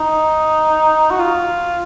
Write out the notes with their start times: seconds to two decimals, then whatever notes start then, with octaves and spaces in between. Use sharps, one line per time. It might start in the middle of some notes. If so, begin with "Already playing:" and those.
Already playing: D#4
1.10 F#4
1.19 F4